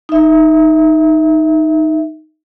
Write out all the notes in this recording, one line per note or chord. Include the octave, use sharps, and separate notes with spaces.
D#4 E5